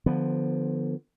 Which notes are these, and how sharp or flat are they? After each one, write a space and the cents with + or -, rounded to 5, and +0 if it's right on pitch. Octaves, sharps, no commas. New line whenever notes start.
D3 +30 F3 +0 B3 +0